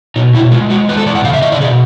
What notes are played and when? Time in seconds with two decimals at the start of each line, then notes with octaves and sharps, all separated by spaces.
0.16 B2 D#4
0.34 B2 E4
0.52 G#3 F4
0.70 G#3 F#4
0.88 E2 B4
0.97 A4
1.06 E2 D5
1.15 F#5
1.24 C#3 F5
1.33 E5
1.42 C#3 D#5
1.52 D5
1.60 B2 G#4